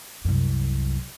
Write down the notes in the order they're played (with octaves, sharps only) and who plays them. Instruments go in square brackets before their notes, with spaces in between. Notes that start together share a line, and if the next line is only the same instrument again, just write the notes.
[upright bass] C2 F#2